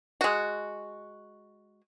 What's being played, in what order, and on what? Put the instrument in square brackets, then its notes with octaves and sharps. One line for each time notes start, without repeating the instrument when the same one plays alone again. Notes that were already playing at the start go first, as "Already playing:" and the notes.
[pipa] G#3 F#4